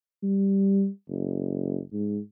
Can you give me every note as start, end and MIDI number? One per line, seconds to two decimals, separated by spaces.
0.23 0.87 55
1.09 1.80 30
1.93 2.19 44